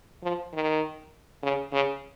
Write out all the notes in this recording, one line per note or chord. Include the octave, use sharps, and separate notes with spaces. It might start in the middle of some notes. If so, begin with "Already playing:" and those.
F3
D#3
C#3
C#3